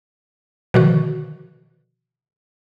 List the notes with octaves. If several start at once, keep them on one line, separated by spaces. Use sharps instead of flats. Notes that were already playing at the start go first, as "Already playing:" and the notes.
B2 D3 D#3 F3 F#4